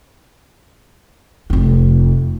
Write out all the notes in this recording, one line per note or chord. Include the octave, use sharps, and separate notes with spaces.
F1 D#4